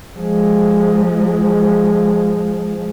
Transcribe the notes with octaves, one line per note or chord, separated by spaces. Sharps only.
F3 G#3